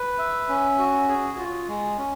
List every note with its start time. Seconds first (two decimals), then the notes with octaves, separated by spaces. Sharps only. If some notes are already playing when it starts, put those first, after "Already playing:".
Already playing: B4
0.19 E5
0.48 C#4
0.78 F#4
1.08 G#4
1.38 F4
1.68 G#3
1.97 C#4